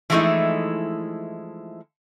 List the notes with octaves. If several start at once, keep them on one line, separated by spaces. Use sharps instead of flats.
E3 F3 G#3 A3 D#4 E4